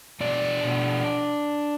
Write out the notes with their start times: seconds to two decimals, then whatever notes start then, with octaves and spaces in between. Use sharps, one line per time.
0.20 B2 D4 D5
0.64 B2